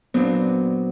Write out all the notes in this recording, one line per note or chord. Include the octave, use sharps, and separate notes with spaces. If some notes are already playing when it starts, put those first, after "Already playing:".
A#2 F#3 B3 C4 D4